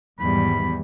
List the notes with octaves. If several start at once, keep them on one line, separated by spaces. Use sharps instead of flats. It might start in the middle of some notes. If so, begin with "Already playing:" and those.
E2 G#2 D#3 G3 B5